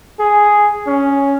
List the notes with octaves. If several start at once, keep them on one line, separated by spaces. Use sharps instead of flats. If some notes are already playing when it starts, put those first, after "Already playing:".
G#4
C#4